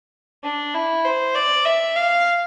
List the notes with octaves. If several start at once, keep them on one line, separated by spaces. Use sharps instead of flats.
D4
E4
C5
D5
E5
F5